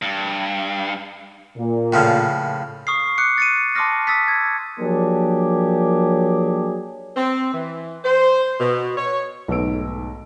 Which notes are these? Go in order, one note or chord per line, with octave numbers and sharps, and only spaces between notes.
G2
A#2
A2 C#3 F3
C#6 D#6 F6 C7
D6 F#6 C#7
A6 C#7 D#7
A5 C6 D6 D#6 F6 A#6
D#6 E6 A6 B6
G#6
F3 F#3 A#3 D4 G4 G#4
C4
E3
C5
B2
C#5
B1 G#2 A3 B3 E6 D7